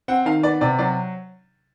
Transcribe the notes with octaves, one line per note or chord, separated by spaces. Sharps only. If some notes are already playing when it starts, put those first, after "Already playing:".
C4 F#5
D#3 F5
B3 D5
C3 D5
F#3 D5